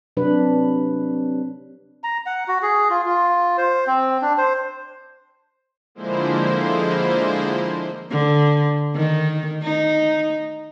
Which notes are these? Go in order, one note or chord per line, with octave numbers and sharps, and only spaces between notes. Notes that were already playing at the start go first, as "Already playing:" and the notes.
C3 F#3 D4 B4
A#5
F#5
F#4
G#4
F4
F4
C5
C4
D4
C5
D3 F3 G#3 A#3 E4 C5
D3
D#3
D#4